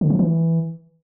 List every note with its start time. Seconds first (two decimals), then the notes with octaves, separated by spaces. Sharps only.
0.01 D3
0.10 F3
0.19 E3